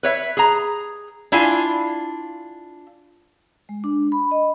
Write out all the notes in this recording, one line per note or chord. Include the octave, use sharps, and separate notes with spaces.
B4 C#5 E5
G#4 A#5
D4 E4 F4 F5 G#5
G#3
D4
B5
D#5